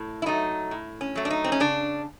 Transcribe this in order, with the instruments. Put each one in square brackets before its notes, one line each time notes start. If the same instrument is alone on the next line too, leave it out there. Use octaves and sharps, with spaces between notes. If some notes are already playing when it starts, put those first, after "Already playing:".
Already playing: [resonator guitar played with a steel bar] A2
E4
F#3 A3 D#4
A2
C#4
F#3 A3
D4
D#4
C4
C#4
C#3 D4